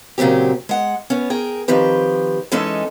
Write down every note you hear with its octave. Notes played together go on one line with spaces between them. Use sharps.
A#2 C#3 F#3 C4 G4
G#3 F#5
B3 C#4
G#4 A#4 G5
D#3 F3 C4 G4 B4
E3 G#3 C#4 D#4 A4